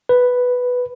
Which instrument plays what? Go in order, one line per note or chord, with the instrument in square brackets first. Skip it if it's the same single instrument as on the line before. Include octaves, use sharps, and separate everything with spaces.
[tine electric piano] B4